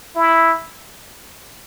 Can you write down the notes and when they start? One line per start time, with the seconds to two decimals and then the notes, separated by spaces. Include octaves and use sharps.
0.16 E4